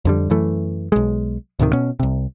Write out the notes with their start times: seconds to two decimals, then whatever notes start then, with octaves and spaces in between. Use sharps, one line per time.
0.05 F2 D3 G3
0.30 F#2 E3 A3
0.92 B1 G#3
1.59 D2 A2 C3 D#3
1.73 B2 C#4
2.00 C2 C3